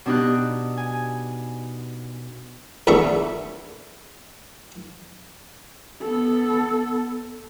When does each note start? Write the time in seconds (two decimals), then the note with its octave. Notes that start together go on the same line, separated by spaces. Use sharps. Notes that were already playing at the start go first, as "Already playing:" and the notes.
0.06 B2 D4 D#4 G4 F#6
0.77 G#5
2.87 A#1 E2 D3 A3 E5 C#6
6.02 B3 A4